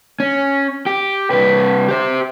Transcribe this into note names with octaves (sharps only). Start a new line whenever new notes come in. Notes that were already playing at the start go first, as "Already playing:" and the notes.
C#4
G4
C2 B4
G4 C5